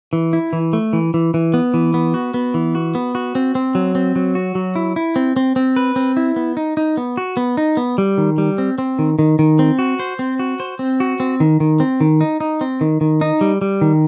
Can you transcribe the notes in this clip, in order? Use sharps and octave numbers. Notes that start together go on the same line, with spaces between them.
E3
E4
E3
A3
E3
E3
E3
B3
E3
B3
F#4
B3
E3
F#4
B3
F#4
C4
C4
F#3
C4
F#3
F#4
F#3
E4
E4
C4
C4
C4
B4
C4
E4
B3
D#4
D#4
B3
F#4
B3
D#4
B3
G3
D#3
G3
C4
C4
D#3
D#3
D#3
C4
F#4
C5
C4
F#4
C5
C4
F#4
C4
D#3
D#3
C4
D#3
D#4
D#4
C4
D#3
D#3
D#4
G3
G3
D#3